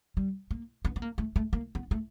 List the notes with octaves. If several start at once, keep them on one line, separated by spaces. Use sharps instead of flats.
G3
A#3
B3
B3
A#3
A3
A3
A#3
B3
A3